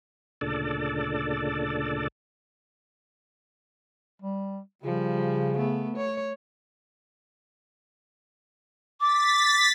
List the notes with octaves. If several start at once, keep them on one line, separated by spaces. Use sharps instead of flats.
D2 A#2 C#3 D4 A4 D5
G3
C#3 F3 G3
A3 B3
C#5
D6 A6 B6